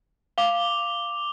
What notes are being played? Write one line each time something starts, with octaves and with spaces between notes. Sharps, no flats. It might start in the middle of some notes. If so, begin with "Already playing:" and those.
F5 D6 F7 G7